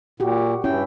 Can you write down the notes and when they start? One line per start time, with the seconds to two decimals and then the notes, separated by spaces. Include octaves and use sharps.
0.20 A#2 F#4 G4
0.64 G2 C#4 E4 G5